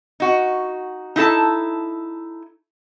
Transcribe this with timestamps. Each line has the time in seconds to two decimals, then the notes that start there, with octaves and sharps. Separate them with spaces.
0.20 D#4 F#4
1.16 D#4 E4 A4 A5